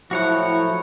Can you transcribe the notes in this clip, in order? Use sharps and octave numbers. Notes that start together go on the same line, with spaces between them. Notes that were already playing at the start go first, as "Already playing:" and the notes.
A2 F3 F#3 E4 F#4 C#5 F#5